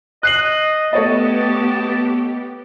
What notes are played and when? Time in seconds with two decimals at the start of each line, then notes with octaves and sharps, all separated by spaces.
0.23 D#5 F#6 C7 F#7
0.93 A3 B3 G4 C#5 D#5 A5